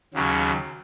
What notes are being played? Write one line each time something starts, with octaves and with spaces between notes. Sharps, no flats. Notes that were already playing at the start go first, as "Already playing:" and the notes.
D#2 C#3 F#3